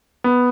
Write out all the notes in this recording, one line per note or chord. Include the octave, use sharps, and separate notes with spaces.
B3